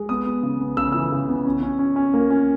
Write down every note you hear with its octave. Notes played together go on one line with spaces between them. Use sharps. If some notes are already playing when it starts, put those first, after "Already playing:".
Already playing: G#3
B3 D#6
B3
C#3
B3
C#3 E6
E3 E6
C#3
B3
C#4
C#4
C#4
C#4
A#3
C#4